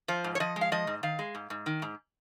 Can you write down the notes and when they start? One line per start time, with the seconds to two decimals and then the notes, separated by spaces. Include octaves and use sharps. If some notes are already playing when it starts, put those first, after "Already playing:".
0.08 F3 C5
0.24 G#2
0.35 C#5
0.40 F3 D#5
0.56 G#3
0.61 F5
0.72 F3 D#5
0.87 G#2
1.03 D#3 F5
1.19 G#3
1.35 G#2
1.50 G#2
1.66 D#3
1.82 G#2